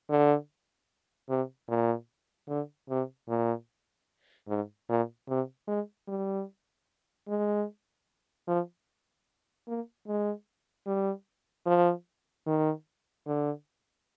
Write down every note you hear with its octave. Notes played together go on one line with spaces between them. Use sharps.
D3
C3
A#2
D3
C3
A#2
G#2
A#2
C3
G#3
G3
G#3
F3
A#3
G#3
G3
F3
D#3
D3